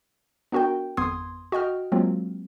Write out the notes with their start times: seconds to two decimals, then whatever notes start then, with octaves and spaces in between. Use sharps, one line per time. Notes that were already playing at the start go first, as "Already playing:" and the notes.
0.52 B3 D4 F#4 A#4 G5
0.97 G#1 F2 B3 C6 D#6 G#6
1.52 F#4 D#5 G5 F6
1.92 F#3 G#3 A#3 C4 F4